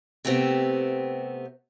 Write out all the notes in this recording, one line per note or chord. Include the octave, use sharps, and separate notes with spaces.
C3 A3 B3 C4 G4